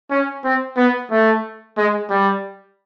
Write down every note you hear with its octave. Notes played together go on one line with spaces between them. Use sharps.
C#4
C4
B3
A3
G#3
G3